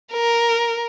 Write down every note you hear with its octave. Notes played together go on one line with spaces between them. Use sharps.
A#4